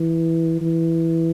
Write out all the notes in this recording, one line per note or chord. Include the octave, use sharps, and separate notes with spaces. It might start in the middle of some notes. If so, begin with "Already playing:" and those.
Already playing: E3
E3